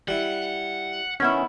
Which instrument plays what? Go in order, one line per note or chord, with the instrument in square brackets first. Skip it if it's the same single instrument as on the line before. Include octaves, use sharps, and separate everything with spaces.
[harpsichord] G3 E4 [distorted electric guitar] F#5
[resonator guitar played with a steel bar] D#3 B3 E4 [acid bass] C#4